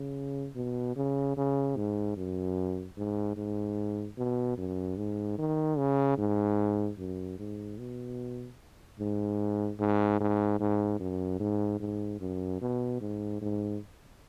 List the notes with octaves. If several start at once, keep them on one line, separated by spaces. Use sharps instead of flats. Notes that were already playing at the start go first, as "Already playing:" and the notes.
Already playing: C#3
B2
C#3
C#3
G#2
F#2
G#2
G#2
B2
F#2
G#2
D#3
C#3
G#2
F#2
G#2
B2
G#2
G#2
G#2
G#2
F#2
G#2
G#2
F#2
B2
G#2
G#2